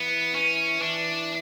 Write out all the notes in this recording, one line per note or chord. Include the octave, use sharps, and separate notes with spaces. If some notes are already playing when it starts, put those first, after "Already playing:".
Already playing: E3 B3
C#4
E3 D4